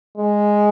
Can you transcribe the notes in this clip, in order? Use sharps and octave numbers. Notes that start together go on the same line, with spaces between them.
G#3